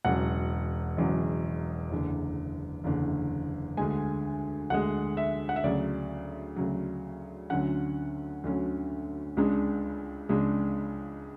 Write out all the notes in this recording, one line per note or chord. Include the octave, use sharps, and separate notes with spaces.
E1 E2 C#3 F#3 F#5
E1 E2 C#3 F#3
F#1 E2 D3
F#1 E2 D3
D2 D3 G#3 G#5
D2 D3 G#3 F#5
E5
F#5
E5
D2 C#3 F#3 D5
D2 C#3 F#3
D2 D3 F#3 C#4 F#5
D2 D3 F#3 C#4
C#2 C#3 G#3 D4
C#2 C#3 G#3 D4